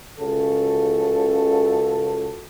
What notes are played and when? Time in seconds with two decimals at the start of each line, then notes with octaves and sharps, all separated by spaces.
0.20 C#2 C#3 F#4 A4